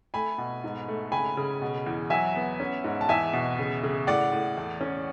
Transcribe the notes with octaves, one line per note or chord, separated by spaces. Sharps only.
A3 G#5 B5
B2
G#2
A3
C#3 G#5 B5
C#3
B2
E2
F#3 E5 G#5
B3
C#4
G#2
A5
E2 E5 G#5
B2
C#3
C#3
A2 D5 F#5
A2
E2
C#4